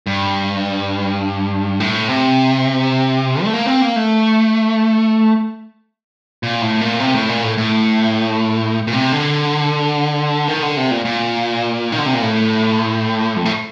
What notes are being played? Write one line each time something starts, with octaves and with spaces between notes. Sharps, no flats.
G2
A2
C3
A3
A#3
C4
A#3
A3
A#2
A2
A#2
C3
A2
A#2
A2
A2
A#2
C3
D3
D#3
D3
C3
A#2
A#2
D#3
D3
C3
A#2
A2
F2
A2